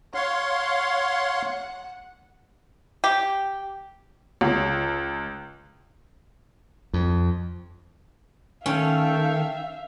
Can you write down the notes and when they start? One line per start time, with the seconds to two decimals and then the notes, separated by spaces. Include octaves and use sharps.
0.15 C#5 F5 F#5 C6
3.04 G4
4.41 C#2
6.93 F2
8.66 D#3 A3 C#4 A4 E5 F5 G5